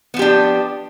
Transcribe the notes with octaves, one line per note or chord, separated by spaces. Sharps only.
F3 B3 D4 G4